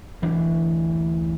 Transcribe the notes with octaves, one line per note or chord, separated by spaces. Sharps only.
D2 E3 D4